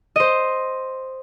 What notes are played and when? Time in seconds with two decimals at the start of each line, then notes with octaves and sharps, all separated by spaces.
0.16 C5 D#5